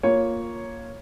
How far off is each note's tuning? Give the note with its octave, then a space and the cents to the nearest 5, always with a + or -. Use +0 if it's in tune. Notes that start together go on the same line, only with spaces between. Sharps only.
A#3 +0 F4 +0 C#5 +0